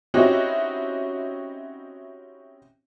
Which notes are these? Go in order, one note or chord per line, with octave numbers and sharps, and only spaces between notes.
C4 C#4 D#4 E4 F#4 G4